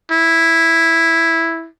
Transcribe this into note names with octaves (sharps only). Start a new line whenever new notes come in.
E4